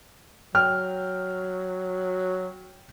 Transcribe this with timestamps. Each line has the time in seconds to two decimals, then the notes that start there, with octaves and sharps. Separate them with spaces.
0.55 F#3 G5 F6